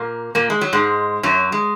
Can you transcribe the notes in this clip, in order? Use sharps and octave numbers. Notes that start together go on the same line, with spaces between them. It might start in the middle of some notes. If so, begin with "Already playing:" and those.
Already playing: A#2 A#3
A#2 A#3
G#3
F#3
G#2 G#3
F#2 F#3
G#3